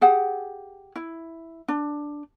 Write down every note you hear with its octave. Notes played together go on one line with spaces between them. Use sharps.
G4 G#4 F#5
E4
D4